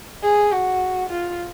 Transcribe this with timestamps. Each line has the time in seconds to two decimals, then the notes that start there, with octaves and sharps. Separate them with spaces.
0.23 G#4
0.51 F#4
1.09 F4